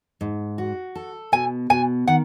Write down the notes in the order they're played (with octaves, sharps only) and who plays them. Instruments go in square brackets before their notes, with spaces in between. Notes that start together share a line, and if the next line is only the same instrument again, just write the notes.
[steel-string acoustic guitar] G#2
F#4
A4
[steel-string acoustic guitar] B2 [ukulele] G#5
[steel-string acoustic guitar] B2 [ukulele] G#5
[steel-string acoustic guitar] D#3 [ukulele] F#5